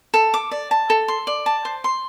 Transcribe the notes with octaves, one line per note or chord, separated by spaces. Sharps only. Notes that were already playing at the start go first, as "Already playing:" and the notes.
A4
D6
D5
A5
A4
C6
D5
A5
C5
C6